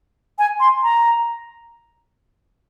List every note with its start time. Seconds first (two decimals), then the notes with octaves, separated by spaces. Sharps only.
0.39 G#5
0.60 C6
0.83 A#5